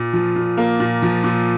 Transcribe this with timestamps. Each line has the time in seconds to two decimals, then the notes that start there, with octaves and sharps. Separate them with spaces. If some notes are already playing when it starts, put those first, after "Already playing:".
Already playing: A#2
0.13 F3
0.36 A#2
0.57 A#3
0.80 A#2
1.02 F3
1.24 A#2